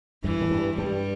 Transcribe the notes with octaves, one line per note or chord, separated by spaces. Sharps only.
G2 E3
A2
G2
G2 G3